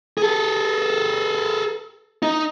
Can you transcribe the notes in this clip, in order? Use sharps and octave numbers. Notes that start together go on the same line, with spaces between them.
G#4 A4
D#4